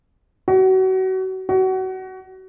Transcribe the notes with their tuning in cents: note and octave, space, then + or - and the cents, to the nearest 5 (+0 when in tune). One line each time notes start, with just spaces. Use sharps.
F#4 +30
F#4 +25